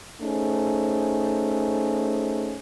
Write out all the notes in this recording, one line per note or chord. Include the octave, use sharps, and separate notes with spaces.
A3 C#4 D#4 G#4 C5